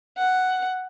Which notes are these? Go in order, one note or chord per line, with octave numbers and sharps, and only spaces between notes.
F#5